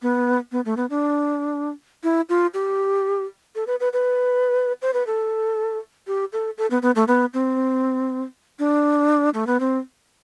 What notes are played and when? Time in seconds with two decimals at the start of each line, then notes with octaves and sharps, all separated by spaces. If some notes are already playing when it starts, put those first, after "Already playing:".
0.02 B3
0.52 B3
0.65 A3
0.77 B3
0.90 D4
2.04 E4
2.29 F4
2.54 G4
3.55 A4
3.67 B4
3.80 B4
3.93 B4
4.82 C5
4.93 B4
5.07 A4
6.07 G4
6.33 A4
6.58 A4
6.70 B3
6.82 B3
6.95 A3
7.08 B3
7.34 C4
8.59 D4
9.34 A3
9.47 B3
9.60 C4